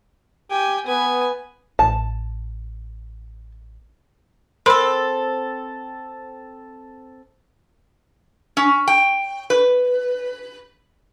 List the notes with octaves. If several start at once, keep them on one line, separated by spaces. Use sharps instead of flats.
G4 G5 G#5
B3 B4 G#5
A1 A5
C4 A4 A#4 B5 C6
C#4
G5
B4